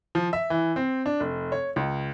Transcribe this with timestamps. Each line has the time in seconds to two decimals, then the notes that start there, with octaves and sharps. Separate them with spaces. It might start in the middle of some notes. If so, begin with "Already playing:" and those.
0.15 F3
0.33 E5
0.50 E3
0.76 C4
1.06 D4
1.20 F1
1.52 C#5
1.76 C#2